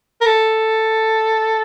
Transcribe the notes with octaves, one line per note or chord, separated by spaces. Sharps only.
A#4
A4